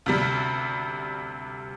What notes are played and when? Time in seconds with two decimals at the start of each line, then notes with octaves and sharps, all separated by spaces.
0.06 D2 C3 G3